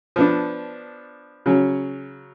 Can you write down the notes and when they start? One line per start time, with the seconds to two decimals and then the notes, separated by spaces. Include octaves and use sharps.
0.16 F3 B3 D4
1.46 C#3 F#3 C#4